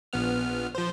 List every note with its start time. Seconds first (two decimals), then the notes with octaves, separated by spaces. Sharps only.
0.13 A#1 B3 F6
0.75 F3 C5